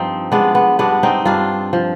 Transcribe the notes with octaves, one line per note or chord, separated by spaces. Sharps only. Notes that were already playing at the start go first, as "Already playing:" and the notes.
Already playing: G2 F3 C4 D#4
G#3 B3 D4
B3
G2 B3 D4
C4 D#4
G2 D4 F4
F3